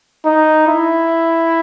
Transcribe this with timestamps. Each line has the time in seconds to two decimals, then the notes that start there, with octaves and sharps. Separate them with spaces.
0.25 D#4
0.68 E4